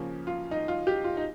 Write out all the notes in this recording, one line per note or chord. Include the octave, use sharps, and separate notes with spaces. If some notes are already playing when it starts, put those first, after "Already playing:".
Already playing: C#3 F3 A#3 C#4
F4
D#4
F4
G4
F4
D#4